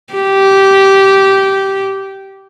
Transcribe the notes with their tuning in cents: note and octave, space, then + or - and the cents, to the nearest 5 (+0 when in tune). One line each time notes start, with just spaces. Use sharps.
G4 -15